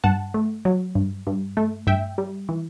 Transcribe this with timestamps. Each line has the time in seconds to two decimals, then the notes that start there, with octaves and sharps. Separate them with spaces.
0.04 G2 F#5 A5
0.34 A3
0.65 F#3
0.95 G2
1.27 G2
1.57 A3
1.87 G2 E5 G5
2.18 G3
2.49 E3